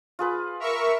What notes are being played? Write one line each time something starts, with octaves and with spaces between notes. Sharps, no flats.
F4 G#4 B4
A#4 E5 C#6